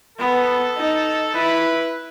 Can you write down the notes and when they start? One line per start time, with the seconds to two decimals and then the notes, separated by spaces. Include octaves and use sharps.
0.18 B3 A4
0.77 D#4
1.34 E4 B4